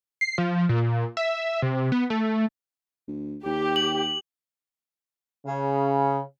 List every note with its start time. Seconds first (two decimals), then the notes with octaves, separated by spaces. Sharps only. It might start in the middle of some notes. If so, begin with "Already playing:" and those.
0.21 C7
0.38 F3
0.69 A#2
1.17 E5
1.62 C3
1.92 B3
2.10 A3
3.08 D2
3.45 D#2 G4
3.76 F#7
5.46 C#3